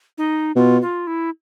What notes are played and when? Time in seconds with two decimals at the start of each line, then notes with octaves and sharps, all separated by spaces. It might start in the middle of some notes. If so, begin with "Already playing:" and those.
0.18 D#4
0.56 B2 F4
0.82 F4
1.07 E4